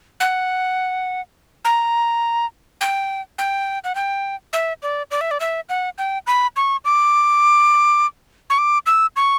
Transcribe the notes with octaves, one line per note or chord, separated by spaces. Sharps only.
F#5
A#5
G5
G5
F#5
G5
E5
D5
D5
E5
D5
E5
F#5
G5
B5
C#6
D6
C#6
D6
E6
C#6